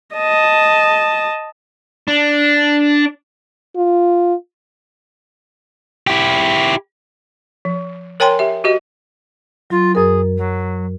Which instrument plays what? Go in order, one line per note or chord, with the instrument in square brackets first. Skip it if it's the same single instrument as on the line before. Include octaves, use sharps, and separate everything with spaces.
[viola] D#5 A5
[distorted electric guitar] D4
[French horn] F4
[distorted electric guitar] E4 G4
[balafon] F3
A#4 C#5 G5 G#5 A#5 C6
G4 E5
F#4 G4 D#5
[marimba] F#3 [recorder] F4
[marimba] F#2 A#4 [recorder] G#4
[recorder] F#3